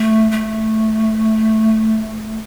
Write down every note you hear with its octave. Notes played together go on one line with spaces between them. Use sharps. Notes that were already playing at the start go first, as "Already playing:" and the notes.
Already playing: A3
A3